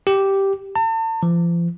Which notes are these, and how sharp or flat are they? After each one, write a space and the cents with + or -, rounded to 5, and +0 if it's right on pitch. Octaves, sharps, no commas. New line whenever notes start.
G4 -5
A5 +40
F3 -40